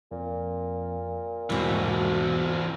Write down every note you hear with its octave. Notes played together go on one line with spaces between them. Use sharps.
F2 A#2
E2 G#2 B2 E3 C4